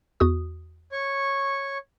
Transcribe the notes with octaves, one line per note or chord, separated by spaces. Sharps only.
E2 F#4 D#6
C#5 C#6